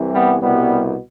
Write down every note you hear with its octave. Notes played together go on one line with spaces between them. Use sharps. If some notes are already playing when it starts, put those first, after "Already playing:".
Already playing: C2 C3 E3
G3 B3
C2 B2 G3 B3